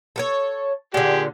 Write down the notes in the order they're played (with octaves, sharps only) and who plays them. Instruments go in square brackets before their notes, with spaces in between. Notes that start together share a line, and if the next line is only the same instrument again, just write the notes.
[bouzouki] A4 A#4 C#5
[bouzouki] A#2 D3 [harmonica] G4 G#4